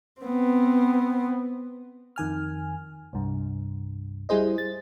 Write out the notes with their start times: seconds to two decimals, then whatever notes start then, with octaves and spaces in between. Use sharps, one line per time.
0.21 B3 C4
2.16 F2 D#3 G#5 F6
3.13 C2 G2
4.29 G3 E4 G#4 C5 D#5
4.58 A6